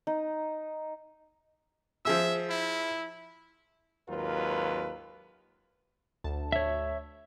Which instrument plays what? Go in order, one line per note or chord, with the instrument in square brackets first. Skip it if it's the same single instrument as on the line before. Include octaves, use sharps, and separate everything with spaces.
[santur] D#4
[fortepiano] F3 G#4 E6 [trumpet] E5
[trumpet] E4
[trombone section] G#1 D#2 F#3 F4 A#4 B4
[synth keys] D2 A5
[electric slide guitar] C#5 E5